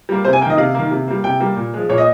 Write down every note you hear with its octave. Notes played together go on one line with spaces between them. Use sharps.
G3 A#3
C3 C5
G#5
A#3 G5
D#3 D#5
C3 F5
D#3 A#3
C3
G3 A#3
C3 G5
G3 A#3
A#2
F3 G#3
A#2 C#5
D#5